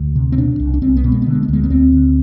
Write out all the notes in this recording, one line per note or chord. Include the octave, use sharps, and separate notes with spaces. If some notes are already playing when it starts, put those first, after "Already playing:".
Already playing: D2
C3
C4
B2 D4
C2
D4
C2 C4
B3
B2
G#3
D3 B3
G#3
B3
D2 G#3
B3
D2 C4
D3